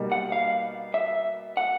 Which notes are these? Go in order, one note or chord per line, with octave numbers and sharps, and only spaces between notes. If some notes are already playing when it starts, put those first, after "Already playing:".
Already playing: B2 G3 A#3 D#4
F#5
F5
E5
F#5